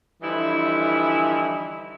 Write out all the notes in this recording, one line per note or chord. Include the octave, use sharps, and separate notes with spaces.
D3 E3 F3 G3 D#4 E4